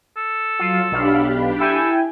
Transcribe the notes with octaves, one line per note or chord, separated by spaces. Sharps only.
A4
F#3 F4
B1 D4 G4 F5 B5
E4 A4 G5 G#5